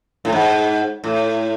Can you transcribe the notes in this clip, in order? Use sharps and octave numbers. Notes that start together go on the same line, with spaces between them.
A2
G#2
A2